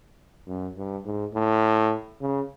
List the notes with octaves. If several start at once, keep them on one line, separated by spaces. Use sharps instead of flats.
F#2
G2
G#2
A2
C#3